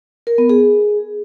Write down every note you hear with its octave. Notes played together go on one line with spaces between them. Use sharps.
A#4
B3
G#4